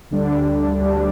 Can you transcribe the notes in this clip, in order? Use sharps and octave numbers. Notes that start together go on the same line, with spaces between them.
D2 D3 G3 D4
D2 D3 G3 D4